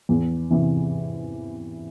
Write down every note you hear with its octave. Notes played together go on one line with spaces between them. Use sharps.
E2
C3 E3